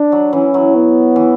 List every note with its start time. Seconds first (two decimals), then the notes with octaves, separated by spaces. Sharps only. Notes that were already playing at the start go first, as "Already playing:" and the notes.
Already playing: D4
0.12 F#3
0.33 E3 C#4
0.54 F#3
0.75 B3
1.16 E3